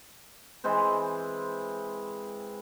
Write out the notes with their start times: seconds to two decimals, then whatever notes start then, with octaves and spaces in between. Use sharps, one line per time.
0.64 E3 G#3 C4 C5